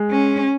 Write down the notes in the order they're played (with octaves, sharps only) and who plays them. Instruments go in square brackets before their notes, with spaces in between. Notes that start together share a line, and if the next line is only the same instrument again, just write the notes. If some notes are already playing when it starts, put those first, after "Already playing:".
Already playing: [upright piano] G#3
[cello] C#4